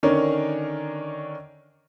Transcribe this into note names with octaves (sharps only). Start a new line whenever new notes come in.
D3 D#3 C#4 D4 A#4 C#5